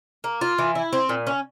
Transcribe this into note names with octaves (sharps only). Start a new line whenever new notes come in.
A#3
F4
E3
E4
C4
A#2
C#4